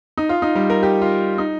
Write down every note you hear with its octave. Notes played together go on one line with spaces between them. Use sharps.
D#4
F4
D#4
G3
A#4
G4
F4
D#4